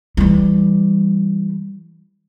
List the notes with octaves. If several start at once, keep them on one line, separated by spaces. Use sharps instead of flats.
E3 G3